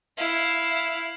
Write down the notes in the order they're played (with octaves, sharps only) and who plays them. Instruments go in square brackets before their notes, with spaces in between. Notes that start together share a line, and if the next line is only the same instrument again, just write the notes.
[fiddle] E4 F5